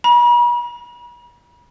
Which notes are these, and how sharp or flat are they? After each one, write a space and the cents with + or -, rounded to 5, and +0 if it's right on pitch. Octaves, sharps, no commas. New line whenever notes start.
B5 -45